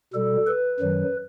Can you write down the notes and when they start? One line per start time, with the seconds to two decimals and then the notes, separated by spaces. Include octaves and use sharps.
0.13 B2 G3 A4
0.47 B4
0.80 F#2 D#3 F#3